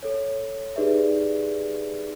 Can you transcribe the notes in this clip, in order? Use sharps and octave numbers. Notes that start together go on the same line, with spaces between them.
A4 C#5
D#4 G4 G#4 B4 D5 E5